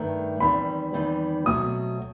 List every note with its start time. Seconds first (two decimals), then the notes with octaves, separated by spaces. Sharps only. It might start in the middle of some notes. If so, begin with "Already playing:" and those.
Already playing: G2 D#3 A3 D#4
0.40 E2 D#3 G3 C4 D#4 B5
0.93 E2 D#3 G3 C4 D#4
1.46 B2 F#3 A3 C4 D#6